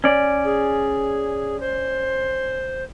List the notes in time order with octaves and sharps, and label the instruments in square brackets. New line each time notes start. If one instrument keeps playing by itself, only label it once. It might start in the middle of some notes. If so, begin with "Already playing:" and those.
[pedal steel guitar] C#4 D5
[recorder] G#4
C5